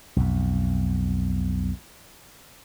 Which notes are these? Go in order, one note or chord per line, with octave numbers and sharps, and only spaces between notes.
B1 F2